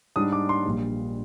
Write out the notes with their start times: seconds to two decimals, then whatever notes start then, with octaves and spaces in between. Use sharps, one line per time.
0.16 G#2 G3 D4 D#6
0.32 D6
0.49 C6
0.65 A#1 A#2 G3